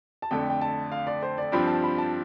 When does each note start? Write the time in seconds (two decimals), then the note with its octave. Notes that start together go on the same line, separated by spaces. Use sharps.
0.22 A5
0.31 F2 D3 A3 G5
0.50 G5
0.61 A5
0.92 F5
1.07 D5
1.23 C5
1.38 D5
1.52 G2 F3 C4 B5
1.67 A5
1.83 B5
1.98 A5